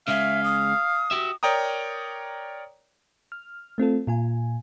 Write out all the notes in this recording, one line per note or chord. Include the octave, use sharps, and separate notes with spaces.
C#3 G#3 C#4 E5 F5
D#6
F#4 G4 E5
A#4 C#5 D5 G5 A#5 D#6
F6
A3 C4 F4 A4
A#2 F4 G#5